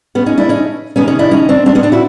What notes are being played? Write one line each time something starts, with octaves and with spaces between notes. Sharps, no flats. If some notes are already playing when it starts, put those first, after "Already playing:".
B3 C#4
C#4 D#4
D4 E4
C#4 D#4
C3 D#3 B3 C#4
C#4 D#4
D4 E4
C#4 D#4
C4 D4
C4 D4
B3 C#4
C4 D4
E4 F#4